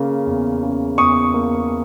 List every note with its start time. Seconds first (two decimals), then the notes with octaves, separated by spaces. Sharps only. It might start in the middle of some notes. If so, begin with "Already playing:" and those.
Already playing: C#3 A#3
0.26 E2
0.63 C#3
0.98 E2 C#6 D#6
1.34 A#3